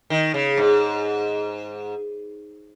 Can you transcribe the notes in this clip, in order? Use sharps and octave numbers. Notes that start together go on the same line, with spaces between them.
D#3
C#3
G#2